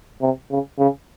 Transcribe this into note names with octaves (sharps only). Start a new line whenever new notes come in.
C3
C#3
C#3